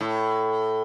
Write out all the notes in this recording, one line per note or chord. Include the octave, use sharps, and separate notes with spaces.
A2